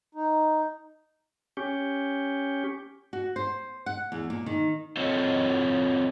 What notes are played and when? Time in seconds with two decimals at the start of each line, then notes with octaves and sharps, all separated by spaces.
0.15 D#4
1.57 C#4 G4
3.13 F#4
3.36 C5
3.86 F#5
4.12 E2
4.30 A#2
4.46 D#3
4.97 C4 F4 A4 C#5 D#5